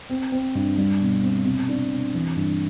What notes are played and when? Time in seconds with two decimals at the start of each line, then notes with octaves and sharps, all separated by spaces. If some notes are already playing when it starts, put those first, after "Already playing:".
0.10 C4
0.32 C4
0.55 G2
0.78 G3
1.01 B2
1.23 C4
1.45 C3
1.69 D4
1.90 C3
2.14 E3
2.36 G2